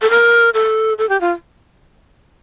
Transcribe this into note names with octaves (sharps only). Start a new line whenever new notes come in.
A4
A#4
A4
A4
G4
F4